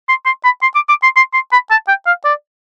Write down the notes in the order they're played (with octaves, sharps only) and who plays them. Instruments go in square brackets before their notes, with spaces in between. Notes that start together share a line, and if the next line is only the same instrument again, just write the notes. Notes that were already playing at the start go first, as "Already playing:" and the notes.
[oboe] C6
C6
B5
C6
D6
D6
C6
C6
C6
B5
A5
G5
F5
D5